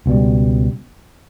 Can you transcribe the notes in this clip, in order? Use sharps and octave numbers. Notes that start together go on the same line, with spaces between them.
C#2 B2 G3